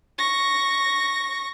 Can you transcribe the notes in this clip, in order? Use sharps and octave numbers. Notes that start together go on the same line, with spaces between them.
C#6 A#6